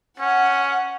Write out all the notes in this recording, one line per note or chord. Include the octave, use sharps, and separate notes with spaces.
C#4 F#5